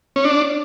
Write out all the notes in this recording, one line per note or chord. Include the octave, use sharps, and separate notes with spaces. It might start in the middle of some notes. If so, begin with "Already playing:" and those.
C#4
D4